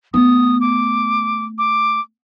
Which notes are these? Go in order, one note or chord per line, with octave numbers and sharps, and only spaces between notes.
A3 B3 D#6
D6
D6